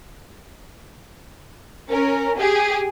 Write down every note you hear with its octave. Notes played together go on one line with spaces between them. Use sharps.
C#4 A#4
G4 G#4